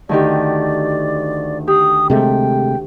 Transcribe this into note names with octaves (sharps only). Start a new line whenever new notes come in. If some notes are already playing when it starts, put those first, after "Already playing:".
D2 D#3 G4 D5
G4 D#6
C3 G#3 A3 G5